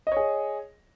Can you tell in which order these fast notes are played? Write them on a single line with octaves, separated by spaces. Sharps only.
D#5 C#5 G#4